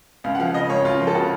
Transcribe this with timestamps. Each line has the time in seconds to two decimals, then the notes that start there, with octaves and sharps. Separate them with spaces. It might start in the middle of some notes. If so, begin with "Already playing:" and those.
0.24 C#2 F5
0.35 F#5
0.39 F3 F5
0.54 C#3 D#5
0.69 C#2 C#5
0.84 C#2 F4
1.00 F3
1.07 A4
1.15 C#3 F#4